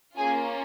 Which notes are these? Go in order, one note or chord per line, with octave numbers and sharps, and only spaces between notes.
A#3 C#4 F4 G#4 G#5